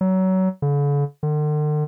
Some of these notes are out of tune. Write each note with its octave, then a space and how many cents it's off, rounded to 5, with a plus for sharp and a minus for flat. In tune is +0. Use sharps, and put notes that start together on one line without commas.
F#3 +25
D3 -45
D3 +45